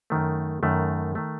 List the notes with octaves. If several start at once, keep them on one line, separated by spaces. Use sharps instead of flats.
F#2 D#3 A3
F#2 D#3 A3
D#3 A3